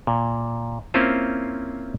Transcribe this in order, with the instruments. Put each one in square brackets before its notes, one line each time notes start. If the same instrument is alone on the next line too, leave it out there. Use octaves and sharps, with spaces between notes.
[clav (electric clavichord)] A#2
A#3 C4 C#4 E4 F4 C5